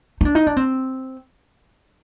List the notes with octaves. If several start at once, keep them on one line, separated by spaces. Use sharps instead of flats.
D#4
D4
D#4
D4
C4